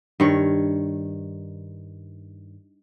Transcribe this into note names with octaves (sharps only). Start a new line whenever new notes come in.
G2 D#3 C#5